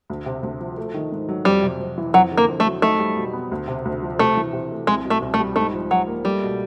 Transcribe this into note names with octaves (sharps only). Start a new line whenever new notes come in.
D2
C3
D2
F3
A3
D#3
G#2
F#3
F2 G3
C3
F2
E3
F2 F#3
D3
A#3
F2
A3
F#3
A3 D#4
G3
B2
B3
D2
C3
D2
F3
C3 A3
E3
C3
A3
C2 G#3
B2
A3
C2
A3
G3
G#2 A3
F3
G#2 F#3
A#3
G3 A3
B2